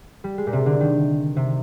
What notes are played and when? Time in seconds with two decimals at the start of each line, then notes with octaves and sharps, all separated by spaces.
0.24 G3
0.38 G#3
0.47 A#2
0.53 C3
0.66 D3
0.80 D#3
1.36 C3